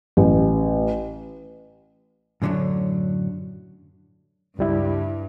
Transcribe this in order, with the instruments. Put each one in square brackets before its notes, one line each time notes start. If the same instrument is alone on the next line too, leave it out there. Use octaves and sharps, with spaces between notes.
[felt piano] A1
[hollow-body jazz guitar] F#2 A2 D3 E3 F#3
[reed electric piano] C#2 G3 E4 [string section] G2